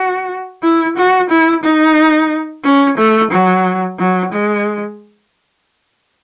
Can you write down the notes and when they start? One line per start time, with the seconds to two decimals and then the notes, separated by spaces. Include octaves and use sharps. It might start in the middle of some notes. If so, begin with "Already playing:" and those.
Already playing: F#4
0.63 E4
0.97 F#4
1.30 E4
1.64 D#4
2.64 C#4
2.98 A3
3.31 F#3
3.99 F#3
4.33 G#3